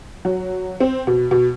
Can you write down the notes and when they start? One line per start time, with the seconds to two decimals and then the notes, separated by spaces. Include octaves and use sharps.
0.25 F#3
0.80 C4
1.07 B2
1.31 B2